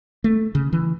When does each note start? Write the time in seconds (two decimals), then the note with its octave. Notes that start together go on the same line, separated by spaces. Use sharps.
0.24 A3
0.55 C#3
0.73 E3